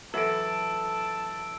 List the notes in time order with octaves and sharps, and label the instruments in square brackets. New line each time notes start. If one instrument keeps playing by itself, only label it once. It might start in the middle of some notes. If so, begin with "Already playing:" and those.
[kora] E3 F#3 [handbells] F#4 A4 [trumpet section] A5 [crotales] E6 D7